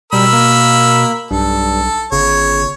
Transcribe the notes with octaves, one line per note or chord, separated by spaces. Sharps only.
B2 G3 A#4 B5 E6
A#3
B1 G2 A4
G1 C#3 C#5